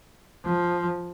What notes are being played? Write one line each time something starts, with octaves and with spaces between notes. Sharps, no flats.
F3